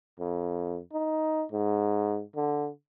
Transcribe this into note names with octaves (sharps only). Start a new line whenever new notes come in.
F2
D#4
G#2
D3